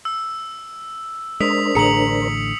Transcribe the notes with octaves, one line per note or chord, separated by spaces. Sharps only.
E6
G#3 D4 A#4 C5 D#6 B6 F7
A1 A2 D3 G#4 A#5 C#7 F7 F#7